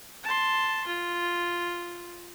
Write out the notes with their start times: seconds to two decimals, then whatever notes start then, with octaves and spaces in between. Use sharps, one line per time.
0.24 A5 C6
0.87 F4